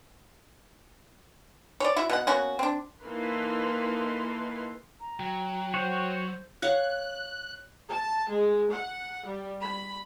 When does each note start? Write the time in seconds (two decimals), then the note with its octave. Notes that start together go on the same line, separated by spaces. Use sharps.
1.80 C#5 D5
1.96 E4 F#4 E5
2.10 B2 F#5
2.27 A#3 B3 C#4 F#4
2.59 C4 D4
3.03 E3 A#3 D#4 A4 B4 C6
5.01 A#5
5.20 F#3 G5
5.74 F#4 C5 C#5 F#5
6.62 C#5 F5 F#5 F#6
7.90 A5
8.28 G#3
8.73 F#5
9.26 G3
9.62 B5